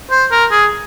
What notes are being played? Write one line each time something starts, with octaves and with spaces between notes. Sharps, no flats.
C5
A#4
G#4